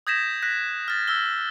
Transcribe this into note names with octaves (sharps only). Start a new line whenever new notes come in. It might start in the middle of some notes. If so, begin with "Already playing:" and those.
D#6 G6 G#6 A#6 B6 E7
F#6 A#6 B6
F6 A6
E6 F6 G7